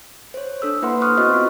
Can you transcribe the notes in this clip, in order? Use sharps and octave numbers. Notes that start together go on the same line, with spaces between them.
C5 C#5
D4 A4 E6
A#3 E4 B4 F#5 C6
C6 C#6 D#6 F6 F#6
B3 C4 F#4 C5 D#5 C#6
E4 F4